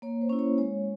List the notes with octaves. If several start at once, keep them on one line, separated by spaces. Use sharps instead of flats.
A#3 C#5
C5
C#4 E4
C#5
G#3 C#5